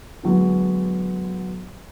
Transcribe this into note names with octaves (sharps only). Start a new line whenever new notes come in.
D3 F#3 G#3 B3